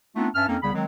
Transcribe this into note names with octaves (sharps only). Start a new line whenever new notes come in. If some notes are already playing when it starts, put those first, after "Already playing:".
A3 B3 C4 D4 D#4 F4
G2 C#4 E5 A5 F6
F2 A#3 C4 C#4 D#4
C2 C#3 G3 B3 B5
D#3 F#3 G#3 C4